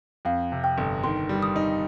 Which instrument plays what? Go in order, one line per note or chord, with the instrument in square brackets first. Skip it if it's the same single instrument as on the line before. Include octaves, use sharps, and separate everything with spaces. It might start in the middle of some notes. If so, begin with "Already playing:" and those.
[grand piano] F2 [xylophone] F5
[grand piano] C3
[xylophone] G5
[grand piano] G1
[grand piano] D#3 [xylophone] C6
[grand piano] G3
[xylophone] D#6
[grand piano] D#4